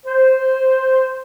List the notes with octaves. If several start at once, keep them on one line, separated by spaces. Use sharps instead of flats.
C5